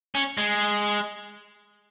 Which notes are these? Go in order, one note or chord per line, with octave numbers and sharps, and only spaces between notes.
C#4
G#3